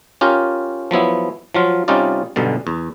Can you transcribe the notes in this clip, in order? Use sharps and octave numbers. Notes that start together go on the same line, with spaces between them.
C#4 F4 G4 A#4
F3 F#3 B3 E4
F3 F#3 F4
C3 G3 C#4 D#4 F4 D5
B1 G2 B2 D3
E2